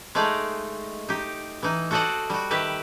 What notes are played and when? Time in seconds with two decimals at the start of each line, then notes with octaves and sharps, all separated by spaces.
0.15 G#3 A3 D#4 D5 F5
1.09 D#4 G4
1.63 E3 D#4
1.91 F#4 A4 C5 D5 D#5 F#5
2.30 G3 F#4
2.51 D#3 G4 B4 E5